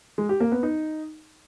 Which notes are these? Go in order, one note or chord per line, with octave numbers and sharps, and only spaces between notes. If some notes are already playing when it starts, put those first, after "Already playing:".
G#3
G4
A#3
B3
D#4